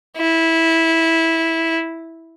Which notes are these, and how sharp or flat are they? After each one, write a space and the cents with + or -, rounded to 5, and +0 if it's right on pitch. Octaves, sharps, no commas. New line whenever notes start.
E4 -10